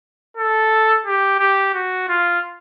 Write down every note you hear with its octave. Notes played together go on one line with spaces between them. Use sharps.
A4
G4
G4
F#4
F4